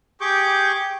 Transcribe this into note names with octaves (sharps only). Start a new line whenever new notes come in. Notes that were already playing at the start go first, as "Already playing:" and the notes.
G4 G#4 G5 C#6 D6 G6